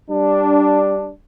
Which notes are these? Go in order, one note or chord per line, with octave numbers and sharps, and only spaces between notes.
G3 D4